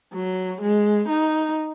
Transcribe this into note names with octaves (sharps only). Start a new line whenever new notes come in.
F#3
G#3
D#4